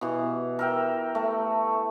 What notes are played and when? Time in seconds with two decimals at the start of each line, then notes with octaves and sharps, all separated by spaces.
0.01 B2 E3
0.59 A#4 E5 G5
1.15 A3